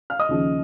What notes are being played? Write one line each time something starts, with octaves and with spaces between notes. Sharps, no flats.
F5 F6
D#5 D#6
D#2 C#3 F3